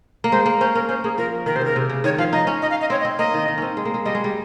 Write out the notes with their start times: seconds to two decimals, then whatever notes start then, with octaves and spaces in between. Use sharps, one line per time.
0.24 A#3
0.32 G#3 C5
0.46 A#3
0.60 C#4 C5
0.75 C#4 A#4
0.89 C#4 C5
1.04 A#3 G#4
1.18 F3 A#4
1.46 D#3 A#4
1.56 C3 C5
1.61 C#3 A#4
1.76 C3
1.90 C#3
2.04 D#3 C#5
2.18 F3 F5
2.33 D#4 D#5
2.47 C#4
2.62 D#5
2.71 F5
2.81 D#5
2.90 C4 C#5
3.00 D#5
3.05 C4
3.19 A#3 D#5
3.34 D#3
3.48 D#3
3.58 C4 C#4
3.77 G#3
3.85 A#3
3.94 G#3
4.05 G3 D#5
4.15 G#3
4.24 G3